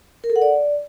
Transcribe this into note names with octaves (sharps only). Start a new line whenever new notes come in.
A#4
A4
F#5
D5